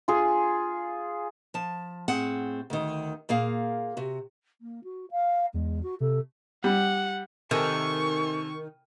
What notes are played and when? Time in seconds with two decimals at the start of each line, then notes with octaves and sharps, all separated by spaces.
0.08 F4 G#4
1.54 F3 A5
2.08 A2 C4 G#4 F#5
2.70 D2 D#3
3.29 A#2 A#3 G#4 F5
3.97 C3 F#4
4.61 A#3
4.84 F#4
5.11 F5
5.54 E2 G#3
5.83 F#4
6.00 C3 A4
6.64 G3 F#5
7.51 C3 D#3 A4 G#5 C#6